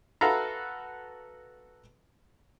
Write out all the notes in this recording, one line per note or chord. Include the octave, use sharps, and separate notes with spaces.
F#4 A4 B4 E5 F5 A#5